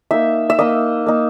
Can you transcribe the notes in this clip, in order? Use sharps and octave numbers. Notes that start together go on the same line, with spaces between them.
A#3 D#4 E5
E5
A#3 D#4 D#5
A#3 D#4